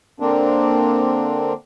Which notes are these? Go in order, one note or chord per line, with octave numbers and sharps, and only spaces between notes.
D3 A#3 C4 D4